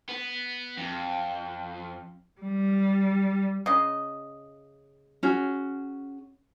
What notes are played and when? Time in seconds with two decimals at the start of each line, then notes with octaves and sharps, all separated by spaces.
0.09 B3
0.77 F2
2.41 G3
3.66 C#3 D#5
5.23 C#4 F#4 G#4